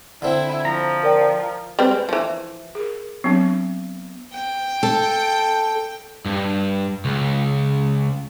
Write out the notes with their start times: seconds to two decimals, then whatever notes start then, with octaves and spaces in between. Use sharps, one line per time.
0.22 D3 C4 E4
0.65 F3 A#5
1.03 A#4 D5 G5
1.79 G3 C4 B4
1.91 G#3
2.09 E3 F3
2.75 G#4 A#4
3.24 F#3 B3 C4 D4
4.33 G5
4.83 A4
6.25 G2
7.05 C#2